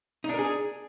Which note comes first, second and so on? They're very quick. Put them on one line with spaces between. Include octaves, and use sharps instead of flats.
D#4 D4 A#4 G#4